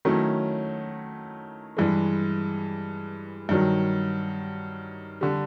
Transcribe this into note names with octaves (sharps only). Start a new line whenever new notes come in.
D#3 F#3 A3 C#4 E4
G2 E3 G#3
G2 D#3 F#3
D3 G3